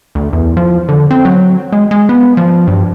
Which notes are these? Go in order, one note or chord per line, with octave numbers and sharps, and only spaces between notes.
D2
E2
F3
D3
C4
F#3
G#3
G#3
B3
F3
G2